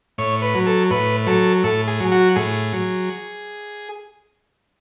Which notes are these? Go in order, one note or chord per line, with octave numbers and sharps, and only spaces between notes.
A2 C#5
B4
F#3
A4
A2 B4
F#3 A4
A2 A4
G#4
F#3
F#4
A2 G#4
F#3